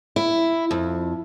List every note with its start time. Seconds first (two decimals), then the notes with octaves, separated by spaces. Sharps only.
0.16 E4
0.71 F2